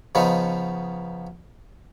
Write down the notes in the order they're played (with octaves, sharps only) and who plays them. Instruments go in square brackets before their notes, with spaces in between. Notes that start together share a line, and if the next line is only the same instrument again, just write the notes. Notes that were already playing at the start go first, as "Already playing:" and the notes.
[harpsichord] C#3 F3 B3 D#4